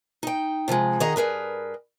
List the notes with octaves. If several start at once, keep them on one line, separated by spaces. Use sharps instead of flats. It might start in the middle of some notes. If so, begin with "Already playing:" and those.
D#4 G5
C3 F3 F#3 G#3
D#3 G#4 D#5 F#5 A#5
G2 G#4 A#4 B4